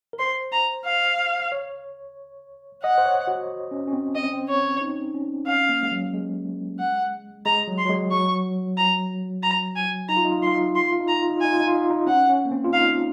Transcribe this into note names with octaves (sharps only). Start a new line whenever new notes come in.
A#4
C5 C6
A#5
F5
C#5
D#5 F#5
C5
C#5
F#4
C#4
C#4
C4
C4 D#5
C#4
C4
C#5
D#4
C#4
C#4 F5
A#3
G#3
F#3
G#3
F#5
G#3 A#5
F#3
C6
F#3
G#3
F#3 C#6
A#5
A#5
G#5
D#4 A#5
F4
D#4
F4
D#4
F4 C6
D#4
F4
D#4
F4 C6
D#4
F4
D#4
F4 A#5
D#4
F4
D#4
F4
D#4 G#5
F4
D#4
F4
D#4
F4
D#4
C#4 F#5
C#4
A#3
C4
F4
D#4 F5